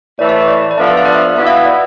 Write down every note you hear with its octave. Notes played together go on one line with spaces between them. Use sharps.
A2 E3 A3 D5
E5
D5
D5
F3 B3 D4 A4 E5
F5
E5
D5
E5
B2 B3 E4 E5
F5
E5
D5